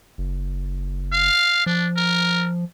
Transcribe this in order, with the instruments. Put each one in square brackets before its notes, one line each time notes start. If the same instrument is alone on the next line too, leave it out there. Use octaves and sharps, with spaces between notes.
[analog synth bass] F#1
[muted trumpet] F5
[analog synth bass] F3 [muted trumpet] D4
[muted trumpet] A#4